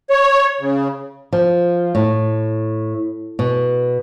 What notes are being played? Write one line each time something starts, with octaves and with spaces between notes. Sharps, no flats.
C#5
C#3
F3
A2
B2